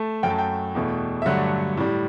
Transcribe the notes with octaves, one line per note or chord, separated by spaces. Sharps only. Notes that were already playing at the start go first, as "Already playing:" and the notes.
Already playing: A3 A5
F#2 F#3 A3 G5
A5
G5
E2 B2 A3
E5
G2 D3 F#3 A3 F#5
A2 G3